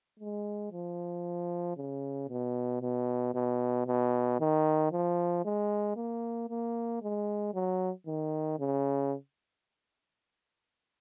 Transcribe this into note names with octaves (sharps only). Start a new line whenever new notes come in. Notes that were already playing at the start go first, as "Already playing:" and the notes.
G#3
F3
C#3
B2
B2
B2
B2
D#3
F3
G#3
A#3
A#3
G#3
F#3
D#3
C#3